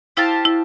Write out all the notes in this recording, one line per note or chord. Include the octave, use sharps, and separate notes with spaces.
E4 G4 C5 F5 A5
E4